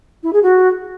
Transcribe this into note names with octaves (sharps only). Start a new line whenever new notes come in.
E4
G#4
F#4